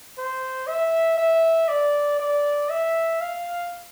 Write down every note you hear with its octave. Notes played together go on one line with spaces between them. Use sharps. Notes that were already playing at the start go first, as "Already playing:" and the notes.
C5
E5
E5
D5
D5
E5
F5